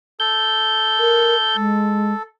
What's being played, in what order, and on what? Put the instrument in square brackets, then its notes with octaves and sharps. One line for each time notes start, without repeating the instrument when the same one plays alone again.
[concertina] A4 [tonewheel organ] G6
[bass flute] A#4
G#3